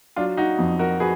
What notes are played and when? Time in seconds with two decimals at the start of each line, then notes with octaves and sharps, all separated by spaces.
0.16 F#3 D4 F4
0.37 D#4 F#4
0.59 F2
0.79 F#4 A#4
1.00 F#4 G#4 B4